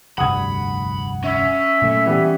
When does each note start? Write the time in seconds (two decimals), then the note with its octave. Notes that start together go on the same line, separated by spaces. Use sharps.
0.18 F1 D2 G2 F#5 B5 D#6 G#6
1.24 C#4 E5
1.82 A#2 F#3 A3
2.06 E3 G3 B3